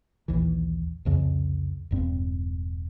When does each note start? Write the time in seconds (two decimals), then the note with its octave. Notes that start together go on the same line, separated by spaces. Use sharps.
0.28 A#1 D#2 E3
1.05 C2 F2 C#3
1.91 E1 G2 C4